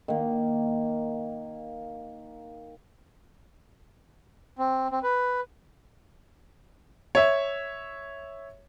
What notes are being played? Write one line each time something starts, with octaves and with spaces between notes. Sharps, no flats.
D#3 A#3
C4
C4
B4
C#5 E5